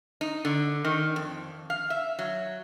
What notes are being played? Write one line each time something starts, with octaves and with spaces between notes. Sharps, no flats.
D#4
D3
D#3
F2
F5
E5
F#3